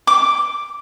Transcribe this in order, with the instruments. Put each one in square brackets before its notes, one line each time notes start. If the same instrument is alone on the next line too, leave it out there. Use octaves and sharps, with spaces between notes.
[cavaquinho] D6